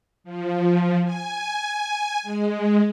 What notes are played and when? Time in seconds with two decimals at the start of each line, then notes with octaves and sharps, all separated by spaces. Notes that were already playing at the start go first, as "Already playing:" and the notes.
0.24 F3
1.04 G#5
2.23 G#3